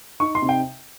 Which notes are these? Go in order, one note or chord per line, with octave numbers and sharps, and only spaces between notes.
D#4 C#6
C6
C3
G5